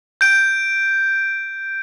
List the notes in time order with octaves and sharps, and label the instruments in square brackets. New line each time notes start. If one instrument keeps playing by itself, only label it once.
[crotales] G6 D7